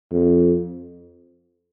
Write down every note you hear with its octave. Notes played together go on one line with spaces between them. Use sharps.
F2